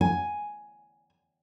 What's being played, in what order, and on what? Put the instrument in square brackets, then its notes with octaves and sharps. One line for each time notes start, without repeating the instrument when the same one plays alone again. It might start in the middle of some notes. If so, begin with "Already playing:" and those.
[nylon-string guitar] G#5